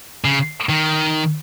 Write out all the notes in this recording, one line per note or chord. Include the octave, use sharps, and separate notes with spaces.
C#3
D#3